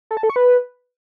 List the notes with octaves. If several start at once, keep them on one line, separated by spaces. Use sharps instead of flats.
A4
A5
A4
C#6
B4